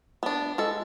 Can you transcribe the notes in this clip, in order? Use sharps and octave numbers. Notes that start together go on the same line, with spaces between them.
B3 D4
G#3 A4